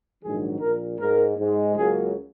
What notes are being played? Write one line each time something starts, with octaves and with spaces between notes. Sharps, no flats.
A#1 G#2 D#3 F#3 G#4
A#1 A#2 A#3 A#4
G#2 G#3 A#4
G#2 G#3
C#2 C#3 F#3 A#3 G#4